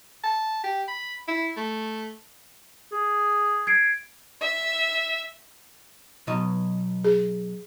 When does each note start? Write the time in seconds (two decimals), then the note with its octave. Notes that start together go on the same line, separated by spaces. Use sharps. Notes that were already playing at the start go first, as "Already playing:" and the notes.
0.24 A5
0.64 G4
0.88 B5
1.28 E4
1.57 A3
2.92 G#4
3.67 G#6 C7 D7
4.41 E5
6.27 B2 F#3 D#5
7.05 G#4